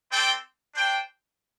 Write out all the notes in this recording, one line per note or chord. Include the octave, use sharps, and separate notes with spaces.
C4 A4 D5 G5
D4 C5 G5